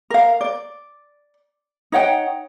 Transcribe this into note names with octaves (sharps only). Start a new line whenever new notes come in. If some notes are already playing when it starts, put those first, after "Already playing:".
A#4 F5
D5
D#4 C#5 F#5 G5